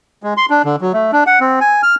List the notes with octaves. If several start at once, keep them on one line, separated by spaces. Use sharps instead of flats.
G#3
C6
D4
D3
F#3
A3
D4
F#5
C4
G#5
F6